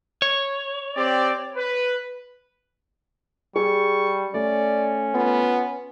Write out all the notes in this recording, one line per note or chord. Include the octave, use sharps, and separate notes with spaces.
C#5
C4 G4 D5
B4
G3 G#4 C#6
A3 C#4 D5
B3 F4